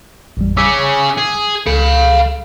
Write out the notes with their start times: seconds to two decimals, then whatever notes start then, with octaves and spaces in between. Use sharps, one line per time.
0.37 A1 F2 G3
0.57 C#4 G#4 D6 E6 B6
1.17 G#4
1.66 C#2 A4 F5 B5 C#7